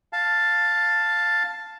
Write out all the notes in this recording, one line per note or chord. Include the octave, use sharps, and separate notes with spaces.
F5 A5